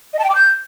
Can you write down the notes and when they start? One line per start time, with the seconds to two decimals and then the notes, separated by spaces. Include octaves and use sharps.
0.13 D#5
0.19 A5
0.24 G5
0.30 D6
0.35 G6